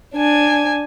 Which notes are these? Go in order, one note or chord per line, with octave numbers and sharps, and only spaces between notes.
D4 G#5